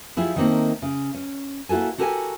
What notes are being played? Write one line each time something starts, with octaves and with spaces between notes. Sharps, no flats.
F3 E4 G4 G#4
D#3 G3 A3 A#3 C4 D#4
C#3
C#4
A#3 E4 F#4 A4 G#5
F#4 G4 A4 A#4 F#5 G#5